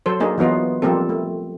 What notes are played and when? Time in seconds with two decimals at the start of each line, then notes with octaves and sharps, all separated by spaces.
0.06 F#3 A4 C5
0.20 A#3 D4 D#4 G#4
0.38 E3 F#3 B3 D#4 F4
0.82 F3 G3 A#3 C4 A4
1.09 A3